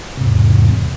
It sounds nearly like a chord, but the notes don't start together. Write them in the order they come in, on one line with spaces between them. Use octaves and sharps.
C3 G#2 E2